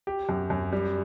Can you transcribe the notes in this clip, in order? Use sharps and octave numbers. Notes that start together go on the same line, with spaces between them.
G4
F#2
F#2
G3